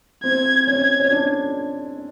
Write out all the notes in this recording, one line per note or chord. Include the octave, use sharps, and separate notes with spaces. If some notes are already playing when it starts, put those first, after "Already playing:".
C4 G#6
C#4 G#6
C#4
D4